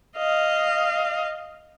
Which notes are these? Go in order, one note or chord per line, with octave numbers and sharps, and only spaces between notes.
D#5 F5